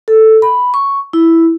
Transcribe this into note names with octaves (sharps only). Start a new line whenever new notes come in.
A4
B5
C#6
E4